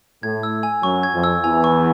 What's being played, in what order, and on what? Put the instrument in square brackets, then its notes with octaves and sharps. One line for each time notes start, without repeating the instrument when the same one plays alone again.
[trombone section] A2 A3 [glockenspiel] G#6
[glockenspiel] E6
G#5
[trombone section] F#2 F#3 [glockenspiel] C#6
[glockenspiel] G#6
[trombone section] F2 F3
[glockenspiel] E6
[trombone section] E2 E3 [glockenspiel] G#5
[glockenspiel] C#6